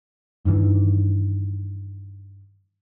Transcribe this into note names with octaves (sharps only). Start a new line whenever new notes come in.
G2 D#3 E3